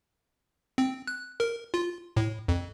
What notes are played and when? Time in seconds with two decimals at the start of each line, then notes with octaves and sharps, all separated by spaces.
0.78 C4
1.07 F#6
1.40 A#4
1.74 F4
2.17 A2
2.48 F2